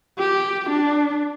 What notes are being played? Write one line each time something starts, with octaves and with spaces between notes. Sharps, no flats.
G4
D4